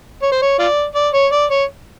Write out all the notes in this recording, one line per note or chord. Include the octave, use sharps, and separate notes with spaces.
C#5
C5
C#5
F4 D5
D5
C#5
D5
C#5